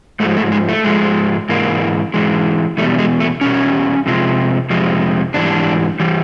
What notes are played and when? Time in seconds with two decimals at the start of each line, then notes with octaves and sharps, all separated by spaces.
0.20 G#2 F3 G#3 A3
0.37 A3
0.52 G#3
0.69 A3
0.84 G#2 F3 G#3
1.49 G#2 E3 G#3 A#3
2.14 G#2 E3 G#3
2.77 E2 B2 G3 A3
2.98 G#3
3.20 A3
3.41 E2 B2 G3 C#4
4.06 F2 C3 F3 G#3
4.70 F2 C3 F3 G#3
5.34 G#2 E3 G3 D4
6.00 E3 G3